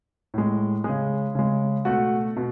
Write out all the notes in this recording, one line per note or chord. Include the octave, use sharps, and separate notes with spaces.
A2 G#3
C#3 G#3 G#4
C#3 G#3
B2 A3 F#4
B2